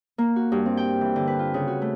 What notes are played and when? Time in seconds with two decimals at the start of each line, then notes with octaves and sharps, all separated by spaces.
0.18 A#3
0.36 F#4
0.52 G2
0.66 C4
0.77 G5
1.01 E3
1.16 D3
1.27 B4
1.39 F4
1.54 C#3
1.67 F#4
1.82 A3